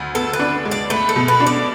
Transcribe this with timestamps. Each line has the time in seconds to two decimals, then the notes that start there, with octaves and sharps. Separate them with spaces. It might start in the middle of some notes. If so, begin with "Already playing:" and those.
Already playing: D2
0.15 B3 A4
0.33 B4
0.39 D4
0.65 G#3
0.71 D5
0.90 A3 B4
1.09 A4
1.16 B2
1.28 B4
1.40 D4
1.47 D5